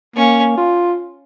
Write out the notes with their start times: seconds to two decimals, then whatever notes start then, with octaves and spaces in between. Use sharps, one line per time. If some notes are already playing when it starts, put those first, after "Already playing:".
0.16 A#3 C#4
0.57 F4